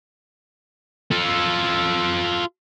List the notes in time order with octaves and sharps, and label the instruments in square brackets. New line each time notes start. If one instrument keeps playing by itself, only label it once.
[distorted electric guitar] F4 A4